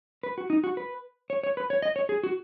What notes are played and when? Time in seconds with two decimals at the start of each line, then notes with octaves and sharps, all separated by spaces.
0.23 B4
0.38 F#4
0.50 D#4
0.64 F#4
0.77 B4
1.30 C#5
1.43 C#5
1.57 B4
1.70 C#5
1.82 D#5
1.96 C#5
2.09 G#4
2.23 F#4